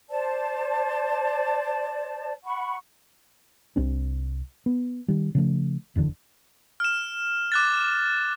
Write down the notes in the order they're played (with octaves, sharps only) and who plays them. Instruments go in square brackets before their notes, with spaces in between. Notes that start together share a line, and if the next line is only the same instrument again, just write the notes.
[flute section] C5 D5 A5
F#5 B5 C#6
[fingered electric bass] C2 C4 D4
B3
D#3 G3
C#3 F3 A3
F1 E2 G#2 D3
[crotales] F6 E7
D6 F#6 A6